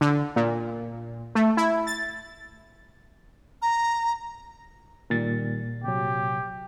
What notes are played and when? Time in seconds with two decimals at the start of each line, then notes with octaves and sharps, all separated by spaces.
0.01 D3
0.36 A#2
1.35 A3
1.57 E4
1.87 A6
3.62 A#5
5.10 A#2 D#3 G3 A6
5.84 C3 F#3 G4